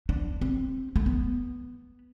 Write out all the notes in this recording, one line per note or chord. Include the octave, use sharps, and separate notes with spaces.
D4
C4
A3
B3